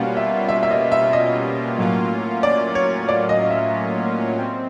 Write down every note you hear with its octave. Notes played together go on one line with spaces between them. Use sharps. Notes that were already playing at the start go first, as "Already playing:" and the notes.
Already playing: B2 G3 A#3 C#4 F4 F#5
E5
E5
E5
D#5
E5
D#5
A2 F#3 A#3 C#4 F4
D5
C#5
D5
D#5
E5
C4